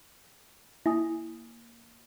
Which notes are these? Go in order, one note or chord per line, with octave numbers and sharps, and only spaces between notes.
A#3 E4 G#5 D#6